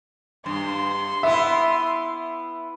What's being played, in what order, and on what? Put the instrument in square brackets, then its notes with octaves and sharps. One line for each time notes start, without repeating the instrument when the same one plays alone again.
[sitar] G2 [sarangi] C6
[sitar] B3 E4 [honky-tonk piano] E5